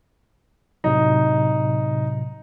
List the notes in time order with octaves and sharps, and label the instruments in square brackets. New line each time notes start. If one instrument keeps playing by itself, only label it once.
[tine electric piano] A2 C3 F#3 [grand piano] D#4